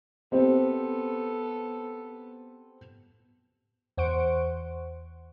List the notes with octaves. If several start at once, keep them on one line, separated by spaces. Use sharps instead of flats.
B3 C4 G4 A4 C5
E2 C5 F#5 C#6 D7